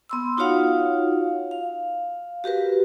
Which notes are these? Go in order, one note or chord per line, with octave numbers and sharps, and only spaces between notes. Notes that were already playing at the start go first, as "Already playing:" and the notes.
B3 C6 E6
D#4 F4 F#4 C#5 F5 F#5
F5
F#4 G4 A#4 B4